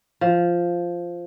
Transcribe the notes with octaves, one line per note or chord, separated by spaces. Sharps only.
F3